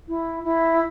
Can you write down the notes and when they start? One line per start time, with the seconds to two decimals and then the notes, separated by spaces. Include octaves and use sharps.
0.08 E4
0.44 E4